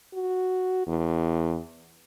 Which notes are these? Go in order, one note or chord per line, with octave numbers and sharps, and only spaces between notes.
F#4
E2